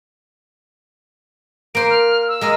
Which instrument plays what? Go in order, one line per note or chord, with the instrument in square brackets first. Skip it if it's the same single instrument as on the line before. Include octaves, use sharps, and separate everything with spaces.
[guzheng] A#3 C5 [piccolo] D7
[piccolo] F6
E6
[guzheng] G#3 A#4 D#5